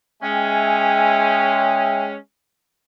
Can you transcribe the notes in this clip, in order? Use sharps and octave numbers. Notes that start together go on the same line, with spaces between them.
G#3 C#4 E5 G5 G#5